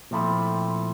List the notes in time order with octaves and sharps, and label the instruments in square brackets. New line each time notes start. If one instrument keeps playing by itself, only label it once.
[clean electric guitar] A#2 F3 A3 C4 E4